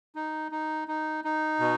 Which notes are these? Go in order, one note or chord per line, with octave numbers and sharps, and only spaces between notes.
D#4
D#4
D#4
D#4
B2